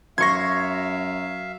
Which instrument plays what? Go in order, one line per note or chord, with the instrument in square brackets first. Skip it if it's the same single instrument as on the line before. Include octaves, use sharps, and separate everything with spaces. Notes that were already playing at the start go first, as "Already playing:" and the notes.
[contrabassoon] F#2 [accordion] E5 F5 [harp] C6 C#6 [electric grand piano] G#6 A#6